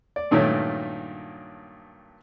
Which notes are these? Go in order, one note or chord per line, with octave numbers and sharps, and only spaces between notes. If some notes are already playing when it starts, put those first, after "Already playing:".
D5
G2 A#2 D#3 F#3 A3 C#4